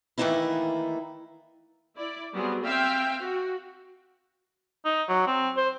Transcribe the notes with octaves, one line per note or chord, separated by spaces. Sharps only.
D#3 E3 A3 A#3 D#4 E4
E4 D5
F#3 G3 B3 C4 G#4
C4 E5 F5 G5
F#4
D#4
F#3
C4
C5